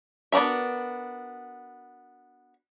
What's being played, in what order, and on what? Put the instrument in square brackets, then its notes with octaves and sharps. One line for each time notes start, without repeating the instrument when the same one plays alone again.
[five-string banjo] B3 D4 F#4 A#4 E5